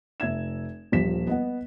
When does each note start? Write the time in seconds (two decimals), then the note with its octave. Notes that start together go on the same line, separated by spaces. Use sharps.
0.20 F1 E5 G#6 E7
0.92 D#1 A#1 F3 G3 B6 E7
1.27 B3 D#5 F#5